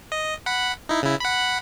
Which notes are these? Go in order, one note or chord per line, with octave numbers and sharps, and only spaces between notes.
D#5
F#5 B5
D#4 E4
C#3 E4
F#5 B5